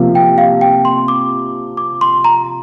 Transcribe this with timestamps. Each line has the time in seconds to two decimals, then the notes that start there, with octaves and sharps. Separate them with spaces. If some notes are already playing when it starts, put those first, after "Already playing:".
Already playing: C3 F3 A#3
0.15 G5
0.38 F5
0.61 G5
0.85 C6
1.08 D6
1.77 D6
2.01 C6
2.24 A#5